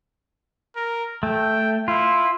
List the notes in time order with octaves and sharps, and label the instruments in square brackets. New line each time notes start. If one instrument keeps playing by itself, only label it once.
[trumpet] A#4
[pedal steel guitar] A3 [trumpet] G5
[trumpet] E4 [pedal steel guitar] F4